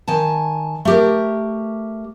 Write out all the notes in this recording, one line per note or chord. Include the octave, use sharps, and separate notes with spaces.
D#3 G#5 A5
A3 G4 A#4